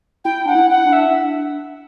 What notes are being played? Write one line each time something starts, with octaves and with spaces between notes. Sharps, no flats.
E4 G5
D4 F#5
E4
F#5
D4
E5